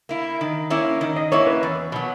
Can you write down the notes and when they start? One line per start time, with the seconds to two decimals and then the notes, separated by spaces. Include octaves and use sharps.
0.09 A#3 E4
0.41 D#3
0.70 A#3 C#4 E4
1.01 D#3
1.16 D#5
1.32 A#3 C#4 E4 C#5
1.47 B4
1.63 E2
1.92 B2 F#3